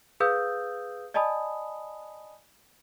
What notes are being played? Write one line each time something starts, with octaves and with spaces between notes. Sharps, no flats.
G#4 B4 F5 D#6 E6 G6
D5 D#5 G#5 A5 B5 D#6